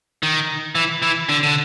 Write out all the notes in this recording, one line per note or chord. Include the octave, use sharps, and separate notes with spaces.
D#3
E3
E3
D3
D3